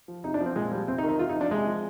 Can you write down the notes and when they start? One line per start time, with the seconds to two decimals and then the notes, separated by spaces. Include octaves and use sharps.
0.08 F3
0.24 C3 D#4
0.34 D4
0.41 F3
0.46 C4
0.56 A#2 G#3
0.71 F3 G3
0.87 C3 C4
0.98 D#4
1.03 D#3
1.09 D#4
1.19 C3 F4
1.29 D#4
1.35 F3
1.41 D4
1.51 C3 G#3
1.66 F3